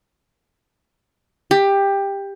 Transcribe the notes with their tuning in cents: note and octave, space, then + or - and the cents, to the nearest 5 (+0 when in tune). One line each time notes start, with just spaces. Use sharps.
G4 +15